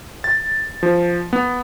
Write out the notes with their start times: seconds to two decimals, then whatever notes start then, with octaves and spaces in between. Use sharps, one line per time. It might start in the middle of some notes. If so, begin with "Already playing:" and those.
0.24 A6
0.83 F3
1.33 B3